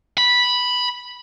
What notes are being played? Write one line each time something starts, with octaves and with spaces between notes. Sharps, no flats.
B5